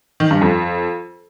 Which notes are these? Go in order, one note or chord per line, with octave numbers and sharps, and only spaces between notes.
D#3
G2
F2